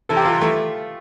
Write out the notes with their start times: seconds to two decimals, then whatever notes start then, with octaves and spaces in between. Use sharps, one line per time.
0.09 C3 E3 A4
0.17 G4
0.25 F4 A4
0.41 E3 A3